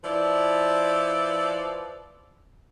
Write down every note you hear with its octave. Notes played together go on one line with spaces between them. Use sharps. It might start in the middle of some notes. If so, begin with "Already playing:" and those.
F3 E4 B4 D5